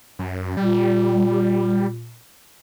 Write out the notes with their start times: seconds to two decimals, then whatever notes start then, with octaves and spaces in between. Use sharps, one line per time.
0.19 F#2
0.57 A#2 G3